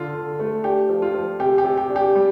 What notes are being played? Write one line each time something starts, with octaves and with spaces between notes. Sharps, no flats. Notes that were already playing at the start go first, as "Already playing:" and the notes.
Already playing: D3 F4
D3
A3
D4 G4
F3
F4
F3
C3 G4
G4
C3
G4
D4
G4
G3